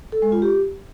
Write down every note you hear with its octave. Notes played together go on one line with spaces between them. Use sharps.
A4
G#3
F4
G4